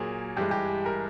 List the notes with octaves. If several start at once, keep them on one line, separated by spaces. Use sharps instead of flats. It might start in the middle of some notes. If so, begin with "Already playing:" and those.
Already playing: A#2 F#3 A#3 G#4
G2 E3 G#3 G4
G4
A#4